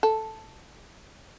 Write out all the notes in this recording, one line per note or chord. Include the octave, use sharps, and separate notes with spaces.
A4